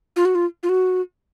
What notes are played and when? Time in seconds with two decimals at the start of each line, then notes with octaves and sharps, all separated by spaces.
0.16 F4
0.25 F#4
0.35 F4
0.63 F4
0.69 F#4